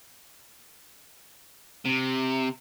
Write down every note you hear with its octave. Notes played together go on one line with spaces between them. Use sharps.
C3